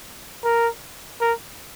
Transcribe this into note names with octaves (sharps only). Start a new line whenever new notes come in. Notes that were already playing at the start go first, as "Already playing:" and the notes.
A#4
A#4